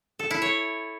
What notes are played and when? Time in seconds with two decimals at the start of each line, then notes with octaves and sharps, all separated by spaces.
0.19 A4
0.31 E4
0.42 C#5